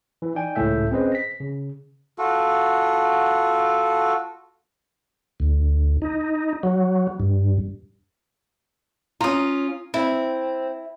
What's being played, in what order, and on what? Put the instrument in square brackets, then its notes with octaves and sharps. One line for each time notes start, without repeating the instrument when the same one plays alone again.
[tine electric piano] E3
D#4 D5 G5 G#5
G#1 C#2 A2 A4 E5 G6
C4 C#4 G#4 B4 C5 D#5
A#6 B6
C#3
[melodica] F4 F#4 A4
[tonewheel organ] D2
D#4
F#3
G2
[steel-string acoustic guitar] C#4 F4 [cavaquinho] A#5 D#6
[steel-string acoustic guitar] C4 [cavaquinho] E4